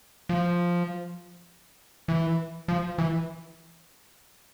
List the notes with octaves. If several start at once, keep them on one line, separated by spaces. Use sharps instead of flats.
F3
E3
F3
E3